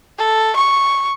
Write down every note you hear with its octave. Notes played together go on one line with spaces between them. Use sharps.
A4
C#6